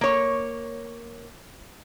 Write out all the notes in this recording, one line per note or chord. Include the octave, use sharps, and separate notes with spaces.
A#3 C#5